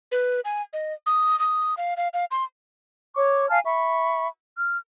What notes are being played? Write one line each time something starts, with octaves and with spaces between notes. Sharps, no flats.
B4
G#5
D#5
D#6
D#6
F5
F5
F5
C6
C#5 C#6 D6
F5 G#5 A5 F6
E5 B5 C#6
F6